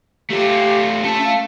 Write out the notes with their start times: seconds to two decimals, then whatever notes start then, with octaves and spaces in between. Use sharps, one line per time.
0.31 A3 F4 G4
1.04 A3 C#4 A4
1.25 F5